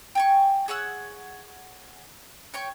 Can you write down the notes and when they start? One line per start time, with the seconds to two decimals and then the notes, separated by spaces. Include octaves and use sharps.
0.15 G5 G#5 C#6
0.68 G#4 C#5 F#5 E6
2.54 C#5 G5 C#6